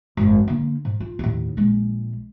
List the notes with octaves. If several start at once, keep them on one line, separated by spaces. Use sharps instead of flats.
G#1 F#2
D3 A#3
G#2
F4
D#2 A2
A#1 G#3